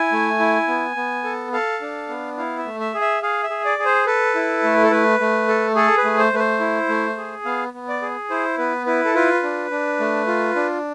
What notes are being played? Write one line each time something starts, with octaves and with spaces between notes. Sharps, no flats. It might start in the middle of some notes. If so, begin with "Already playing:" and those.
Already playing: E4 G#5
A3
E4
B3
B3
A4
A4 F5
D4
B3
E4 F5
E5
A3
E5
G#4
E5
G#4 F5
E5
G#4
D5
G#4
C5
A4 B4
E4
A3
A4
A3 B4
A3
A4
G#4 A4
B4
A3
C5
A3 B4
C5
E4
A3
G#4
B3 F5
B3
D5
G#4
E4 C5
B3 B4
E4 B4
A4
F4 B4
D4
D4
A3
F4
D4